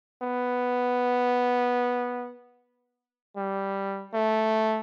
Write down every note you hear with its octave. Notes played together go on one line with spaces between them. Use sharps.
B3
G3
A3